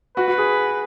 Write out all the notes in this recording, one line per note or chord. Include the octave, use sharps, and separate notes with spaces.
F#4 B4
F#4
G#4